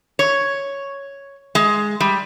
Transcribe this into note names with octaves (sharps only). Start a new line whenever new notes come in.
C#5
G#3
G3